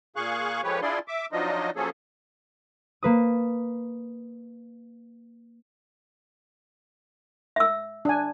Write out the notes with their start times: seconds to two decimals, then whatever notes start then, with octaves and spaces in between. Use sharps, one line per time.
0.16 A#2 G#4 F5 C#6 F#6
0.64 D3 F3 G#3 G4 B4 C#5
0.82 D4 E4 F4 G#4 D5 C6
1.08 E5 D6
1.32 F3 F#3 D4 D#4 F4 D#5
1.76 F3 F#3 A#3 C#4 G#4 A4
3.03 A#3 B4 D#6
7.56 E5 E6
8.05 D4 G#5